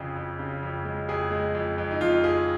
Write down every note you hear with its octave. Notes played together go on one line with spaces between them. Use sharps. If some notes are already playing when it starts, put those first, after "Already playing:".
Already playing: F2 C#3 G#4
F2
C#3
F2
G#3
F2 G#4
G#3
F2
F2
D#4
F2 F4
F2 G#4